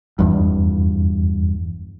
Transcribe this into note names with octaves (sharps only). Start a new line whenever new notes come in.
F1 E2 G2